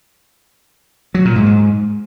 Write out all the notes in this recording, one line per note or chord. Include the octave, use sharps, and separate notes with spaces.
F#3
A#2
G#2
G#2